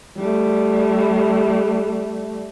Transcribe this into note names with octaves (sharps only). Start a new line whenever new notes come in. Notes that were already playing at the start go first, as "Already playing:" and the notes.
G3 A3